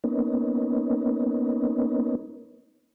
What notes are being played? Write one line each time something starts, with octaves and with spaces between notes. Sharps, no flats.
A#3 B3 C#4 D#4